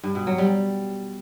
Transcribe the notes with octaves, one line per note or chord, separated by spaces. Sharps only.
G2
B2
F#3
G3